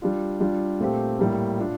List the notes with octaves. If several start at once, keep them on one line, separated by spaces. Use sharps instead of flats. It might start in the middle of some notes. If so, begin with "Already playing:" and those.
G3 D4 F4
G3 D4 F4
A#2 A3 C4 G4
A2 G3 A#3
D4 F4